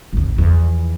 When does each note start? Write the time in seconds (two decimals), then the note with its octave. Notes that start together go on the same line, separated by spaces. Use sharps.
0.13 G#1 D#2
0.36 E2 F3